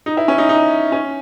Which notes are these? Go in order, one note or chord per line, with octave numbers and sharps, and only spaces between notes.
D#4
E4
C#4
D#4
D#4
C#4